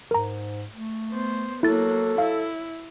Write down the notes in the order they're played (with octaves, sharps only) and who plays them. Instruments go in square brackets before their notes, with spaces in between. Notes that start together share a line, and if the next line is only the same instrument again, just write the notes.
[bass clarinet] G#2 [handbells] A#4 A#5
[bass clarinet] A3
[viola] B3 C5
[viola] F#3 A#3 [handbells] E4 A6 [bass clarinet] A4
[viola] E4 [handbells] F5